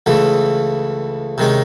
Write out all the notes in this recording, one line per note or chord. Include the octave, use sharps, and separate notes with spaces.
C#2 C#3 E3 A3
C3 D#3 G#3 C#4